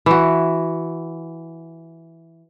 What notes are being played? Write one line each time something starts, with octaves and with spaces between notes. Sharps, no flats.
E3 F#4